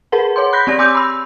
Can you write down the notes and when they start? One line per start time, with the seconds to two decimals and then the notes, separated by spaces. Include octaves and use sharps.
0.12 G#4 A#4 B4 F#5
0.36 C#5 F#5 C6
0.53 B5 F#6 G6 A#6 B6
0.67 C4 G4 D5 A#6
0.78 C#5 G#5 C6 D6 E6 G6
0.95 B5 E6